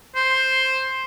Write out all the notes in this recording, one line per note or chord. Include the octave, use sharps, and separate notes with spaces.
C5